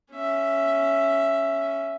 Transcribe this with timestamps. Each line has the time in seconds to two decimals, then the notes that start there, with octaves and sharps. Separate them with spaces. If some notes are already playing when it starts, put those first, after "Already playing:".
0.13 C#4 E5